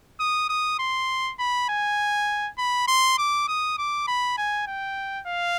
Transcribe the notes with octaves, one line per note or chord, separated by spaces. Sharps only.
D#6
D#6
C6
B5
G#5
B5
C6
D6
D#6
D6
B5
G#5
G5
F5